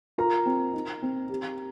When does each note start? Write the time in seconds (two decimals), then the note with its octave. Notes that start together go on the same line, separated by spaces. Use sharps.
0.18 F4 A#4 A#5
0.46 C4
0.73 D#4
1.03 C4
1.29 G4